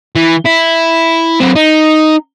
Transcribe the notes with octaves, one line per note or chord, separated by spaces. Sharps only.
E3
E4
F#3 C4
D#4